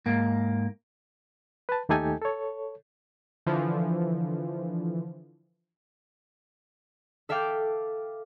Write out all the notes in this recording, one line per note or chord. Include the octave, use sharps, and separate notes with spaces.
G#2 A#3
B4 A5
D#2 A3 D#4 G4 A4 G#5
A4 C#5
D3 E3 F3
A4 E5 F5 G5 D6 G6